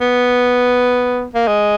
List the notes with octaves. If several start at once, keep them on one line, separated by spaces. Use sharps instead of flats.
B3
A#3
G#3